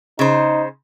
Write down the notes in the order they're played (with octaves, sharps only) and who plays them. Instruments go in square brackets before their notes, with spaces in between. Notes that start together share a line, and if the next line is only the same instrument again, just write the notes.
[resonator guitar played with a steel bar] C#3 C5 [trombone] D#4